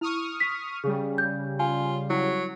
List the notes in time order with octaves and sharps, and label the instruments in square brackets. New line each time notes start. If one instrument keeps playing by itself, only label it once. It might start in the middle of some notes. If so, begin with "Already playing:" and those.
[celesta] E4 [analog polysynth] C#6 D#6 F6
[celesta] B6
[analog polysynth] C#3 G3 [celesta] G#4
[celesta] G6
[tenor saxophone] F4 [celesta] G#5
[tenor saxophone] F#3 [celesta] E4